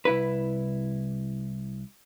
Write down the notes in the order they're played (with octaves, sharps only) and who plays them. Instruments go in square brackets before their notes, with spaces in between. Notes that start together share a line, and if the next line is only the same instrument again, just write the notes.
[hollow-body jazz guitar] C2 E4 B4